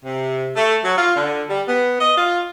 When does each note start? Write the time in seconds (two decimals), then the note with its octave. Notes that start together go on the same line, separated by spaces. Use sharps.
0.04 C3
0.55 A3
0.84 F#3
0.98 F4
1.16 D3
1.50 G3
1.67 B3
2.00 D#5
2.17 F4